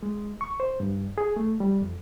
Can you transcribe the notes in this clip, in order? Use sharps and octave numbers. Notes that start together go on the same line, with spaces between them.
G#3
C#6
C5
G2
G#4
A3
G3
F2